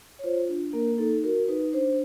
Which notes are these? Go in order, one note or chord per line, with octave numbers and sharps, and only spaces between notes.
C#5
F4 C5
D4
A#3 A#4
D#4 A4
F#4 A#4
D#4 B4
D4 C5